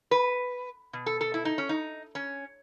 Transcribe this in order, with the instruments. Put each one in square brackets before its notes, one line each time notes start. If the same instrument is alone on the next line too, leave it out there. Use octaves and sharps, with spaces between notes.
[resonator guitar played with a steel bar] B4
B2
A4
A4
E4
D#4
C#4
D#4
C#4